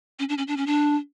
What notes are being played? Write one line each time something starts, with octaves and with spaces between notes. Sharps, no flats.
C#4
D4
C#4
D4
C#4
D4